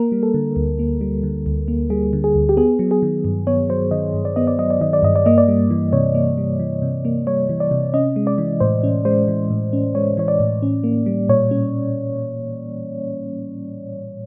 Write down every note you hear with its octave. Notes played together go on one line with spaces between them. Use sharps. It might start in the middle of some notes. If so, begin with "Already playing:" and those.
Already playing: A#3 A#4
G3
A4
D3
D2
A#3
G3
D3
D2
A#3
G3 G#4
D3
G#4
D2
G4
B3 G#4
F#3
G#4
D#3
G2
B3 C#5
F#3 C5
D#3 D#5
G2
D5
B3 D#5
D5
F#3 D#5
D5
D#3 D#5
D5
G2 D#5
D5
A#3 D#5
D5
G3
E3
C3 C#5
A#3
G3
E3
C3
A#3
G3 C#5
E3
D5
C3
C#4 D#5
G#3
D5
E3
A2 C5
C#4
G#3 C5
E3
A2
C#4
G#3 C#5
E3 C#5
D5
A2
C#4
A#3
G3
A#2 C#5
C#4